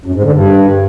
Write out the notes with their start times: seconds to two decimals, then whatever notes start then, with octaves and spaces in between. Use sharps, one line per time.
0.06 F#2
0.15 G#2
0.24 D3
0.32 G2